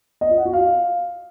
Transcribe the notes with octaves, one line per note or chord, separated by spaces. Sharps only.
D#5
F4
F#5
F#4
F5